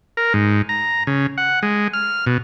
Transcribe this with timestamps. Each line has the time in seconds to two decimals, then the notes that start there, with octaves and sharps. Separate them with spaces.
0.17 A#4
0.34 G#2
0.69 A#5
1.07 C#3
1.38 F#5
1.63 G#3
1.94 F6
2.26 B2